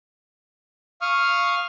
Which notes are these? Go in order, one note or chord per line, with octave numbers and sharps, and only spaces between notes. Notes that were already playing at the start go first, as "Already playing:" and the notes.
F5 C#6 D#6 F6